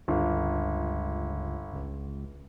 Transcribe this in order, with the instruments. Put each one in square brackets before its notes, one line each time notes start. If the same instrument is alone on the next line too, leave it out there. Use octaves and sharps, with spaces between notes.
[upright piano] G1 [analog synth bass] C#2
[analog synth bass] C#2